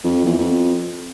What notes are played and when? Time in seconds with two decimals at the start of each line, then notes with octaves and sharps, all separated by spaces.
0.04 F2
0.26 E2
0.38 F2